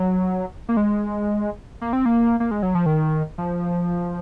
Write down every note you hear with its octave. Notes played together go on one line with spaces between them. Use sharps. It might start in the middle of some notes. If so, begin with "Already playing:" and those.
Already playing: F#3
A#3
G#3
A#3
C4
A#3
A#3
G#3
F#3
F3
D#3
F3